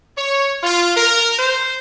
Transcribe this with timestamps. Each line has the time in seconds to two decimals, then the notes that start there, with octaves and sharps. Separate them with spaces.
0.17 C#5
0.63 F4
0.96 A#4
1.39 C5